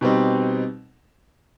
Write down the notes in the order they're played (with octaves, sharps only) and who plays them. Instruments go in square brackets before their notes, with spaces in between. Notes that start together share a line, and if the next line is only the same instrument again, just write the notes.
[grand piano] B2 G3 C4 D#4